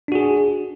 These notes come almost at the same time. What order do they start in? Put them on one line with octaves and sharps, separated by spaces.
D4 F#4 G#4